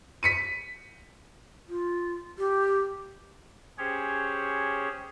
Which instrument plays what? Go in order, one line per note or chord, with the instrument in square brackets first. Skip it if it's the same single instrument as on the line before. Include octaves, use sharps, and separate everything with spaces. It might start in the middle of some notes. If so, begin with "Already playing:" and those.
[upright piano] B6 C#7 D#7
[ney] F4
G4
[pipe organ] C#4 G4 G#4 C5 C#5